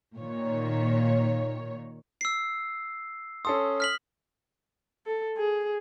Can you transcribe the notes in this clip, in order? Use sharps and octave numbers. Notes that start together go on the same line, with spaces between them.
A#2 D#3 C#5
E6 C7
C#4 A4 C6 D#6
F6 B6 F#7
A4
G#4